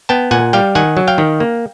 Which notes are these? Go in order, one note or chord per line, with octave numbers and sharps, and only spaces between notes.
B3 G5 A5
A#2 F#5 G#5
G3 F5 G5
D#3 F#5 G#5
F#3
F5 G5
D#3
A#3